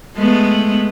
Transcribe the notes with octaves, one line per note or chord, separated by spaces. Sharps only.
G#3 A3 B3